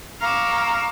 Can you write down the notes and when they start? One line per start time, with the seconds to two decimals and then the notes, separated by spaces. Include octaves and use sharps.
0.20 F5 A#5 C#6 D6 E6